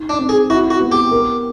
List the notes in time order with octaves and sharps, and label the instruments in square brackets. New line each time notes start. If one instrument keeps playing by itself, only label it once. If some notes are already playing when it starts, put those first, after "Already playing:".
Already playing: [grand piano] D#4
[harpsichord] D4
[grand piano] C4
[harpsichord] G#4
[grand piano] E4 [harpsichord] F#4
[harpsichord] F#4
[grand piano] B3
[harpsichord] G4
[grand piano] A#4